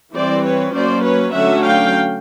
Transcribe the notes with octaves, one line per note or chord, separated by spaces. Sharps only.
E3 G3 C4 C5 D5
B4 C#5
F#3 A#3 C#4 C5 D5
B4 C#5
D3 F#3 A3 C#4 E5 F#5
F5 G5